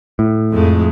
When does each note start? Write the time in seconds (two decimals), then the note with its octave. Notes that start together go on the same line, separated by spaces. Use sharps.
0.19 A2
0.52 F2 G#3 A3